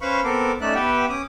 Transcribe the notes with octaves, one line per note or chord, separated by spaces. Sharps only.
C#4 B4 C5 F5 B5 C#6
B3 C4 A4 A#4 D6
A3 C#4 D#4 D5 E5 F#6
B3 G4 B4 E5 F#5 G5
C#4 D6 D#6